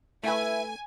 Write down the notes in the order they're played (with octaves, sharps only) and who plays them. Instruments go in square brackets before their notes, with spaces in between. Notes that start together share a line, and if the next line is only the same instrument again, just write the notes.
[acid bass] A3 [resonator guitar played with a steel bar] E4 B4 [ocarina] E5 [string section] G#5